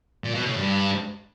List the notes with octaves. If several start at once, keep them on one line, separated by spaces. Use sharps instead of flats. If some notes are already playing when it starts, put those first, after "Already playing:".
A#2
B2
A2
G2